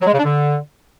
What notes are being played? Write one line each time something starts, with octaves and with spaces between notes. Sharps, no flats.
F#3
G#3
C#3
D4
D3